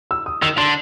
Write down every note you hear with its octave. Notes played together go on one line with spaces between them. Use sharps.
E6
D#6
D#3 E6
D3 C6